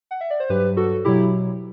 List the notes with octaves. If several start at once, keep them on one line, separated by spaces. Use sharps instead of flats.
F#5
E5
D5
C5
G2 F#3 G4 B4
F#4 A4
B2 F#3 E4 G4